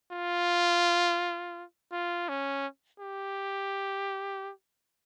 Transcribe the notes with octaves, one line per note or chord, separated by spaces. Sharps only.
F4
F4
C#4
G4